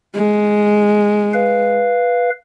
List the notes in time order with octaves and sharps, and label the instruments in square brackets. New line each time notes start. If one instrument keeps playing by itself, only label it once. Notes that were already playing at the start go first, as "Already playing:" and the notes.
[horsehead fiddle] G#3
[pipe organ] B4 F5